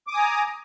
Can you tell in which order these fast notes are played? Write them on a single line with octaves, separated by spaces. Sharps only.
D6 D#6 G#5 A#5